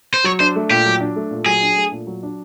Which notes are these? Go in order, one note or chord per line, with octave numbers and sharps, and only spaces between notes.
C5
F#3 C#5
D4 C5
A3
A#2 G4
F#3
D4
A3
A#2
F#3 G#4
D4
A3
A#2
F#3
D4